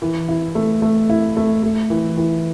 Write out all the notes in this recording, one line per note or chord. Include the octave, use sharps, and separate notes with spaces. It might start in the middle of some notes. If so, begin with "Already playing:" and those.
E3
E4
A3
A3
E4
A3
A3
E3
E3